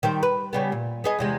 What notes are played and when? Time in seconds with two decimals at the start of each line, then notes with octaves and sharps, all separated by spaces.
0.03 D#3 G3 C5
0.23 B4
0.53 C#3 G3 B3
0.72 A#2
1.04 B3 G#4 D#5
1.19 E2 C3 G#3